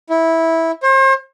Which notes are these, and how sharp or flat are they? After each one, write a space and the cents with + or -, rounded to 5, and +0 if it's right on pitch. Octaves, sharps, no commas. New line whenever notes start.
E4 -10
C5 +40